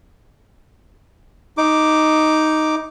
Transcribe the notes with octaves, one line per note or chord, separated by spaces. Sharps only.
D#4 D6